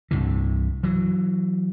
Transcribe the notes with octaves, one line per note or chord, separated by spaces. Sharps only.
C2 G2 C3 E3
E3 F#3